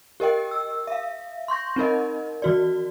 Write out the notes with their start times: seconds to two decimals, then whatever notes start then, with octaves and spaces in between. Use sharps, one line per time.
0.20 G4 A#4 D#5 G5
0.51 E6
0.87 E5 F5
1.48 C6 C#6 G6 A#6
1.76 C4 D#4 A#4 D#5
2.42 E3 F#4 D5